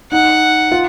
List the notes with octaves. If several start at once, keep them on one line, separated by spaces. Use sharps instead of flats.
D#4 F#5
F4